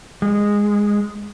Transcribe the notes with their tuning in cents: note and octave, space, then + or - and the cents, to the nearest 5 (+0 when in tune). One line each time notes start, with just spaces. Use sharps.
G#3 -10